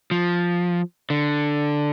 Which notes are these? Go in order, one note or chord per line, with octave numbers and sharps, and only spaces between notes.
F3
D3